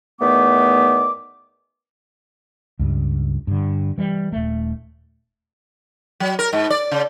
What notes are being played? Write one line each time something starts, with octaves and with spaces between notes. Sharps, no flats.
E2 D#3 A3 B3 D6
C#2 G2
G2 D3
E3 G3
D#1 A3
F#3
A#4
G#2
D5
C#3